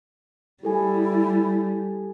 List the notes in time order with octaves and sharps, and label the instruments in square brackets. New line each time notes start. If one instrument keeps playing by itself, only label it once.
[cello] G3 [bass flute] E4 [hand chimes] G4 A4 G#5